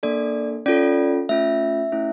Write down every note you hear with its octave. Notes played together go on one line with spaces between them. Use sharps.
A#3 D4 A4 D5
C#4 F4 A4 D5
A3 C#4 F4 E5
A3 C#4 E4